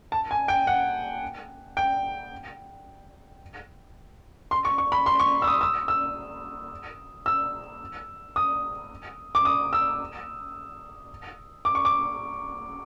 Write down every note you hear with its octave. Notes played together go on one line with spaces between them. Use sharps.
A5
G#5
G5
F#5
G5
C6
C#6
C#6
B5
C6
C#6
E6
D#6
E6
E6
E6
D#6
D6
D#6
E6
D6
C#6
D6